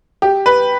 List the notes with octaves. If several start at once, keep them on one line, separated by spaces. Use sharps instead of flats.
G4
B4